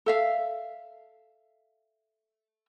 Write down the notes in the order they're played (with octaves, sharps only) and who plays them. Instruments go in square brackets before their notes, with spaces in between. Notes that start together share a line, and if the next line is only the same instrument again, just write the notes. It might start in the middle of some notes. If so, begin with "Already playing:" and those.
[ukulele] A4 E5 F5